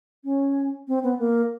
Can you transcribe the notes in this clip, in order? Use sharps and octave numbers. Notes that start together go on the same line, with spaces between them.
C#4
C4
B3
A#3